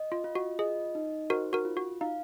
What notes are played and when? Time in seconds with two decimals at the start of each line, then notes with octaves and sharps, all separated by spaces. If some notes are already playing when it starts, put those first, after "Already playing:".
Already playing: D#5
0.12 F4
0.24 F4
0.35 F#4
0.59 G#4 D#5
0.95 D#4
1.30 F#4 A#4 C5
1.53 F#4 A#4
1.65 F4
1.77 F#4
2.01 D#4 F5